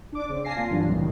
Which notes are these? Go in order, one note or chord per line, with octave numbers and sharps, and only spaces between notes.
D4 D6
C#3 C4
D5 F5 G#5 A5 A#6 C7
A#3 F4
G2 C3 E3 F#3 D4
C2 A2 C3 D#3 E3